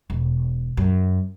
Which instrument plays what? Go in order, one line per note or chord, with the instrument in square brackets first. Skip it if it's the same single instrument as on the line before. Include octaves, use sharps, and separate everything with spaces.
[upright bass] E1
F#2